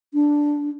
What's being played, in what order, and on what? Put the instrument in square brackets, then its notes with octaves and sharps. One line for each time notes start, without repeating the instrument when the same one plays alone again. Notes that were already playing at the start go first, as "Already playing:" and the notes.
[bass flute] D4